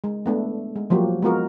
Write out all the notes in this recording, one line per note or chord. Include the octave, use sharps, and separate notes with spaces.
G#3
A3 B3 D4
G#3
F3 F#3 A#3 F#4 G4
G#3 A#3 B3 F4 F#4 A#4